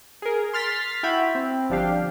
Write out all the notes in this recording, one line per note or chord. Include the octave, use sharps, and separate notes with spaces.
G#4 A#4
C6 F6 A6 B6
E4 F#4 E5 G5 B5
C4
G1 F3 D4 G4 F5 G5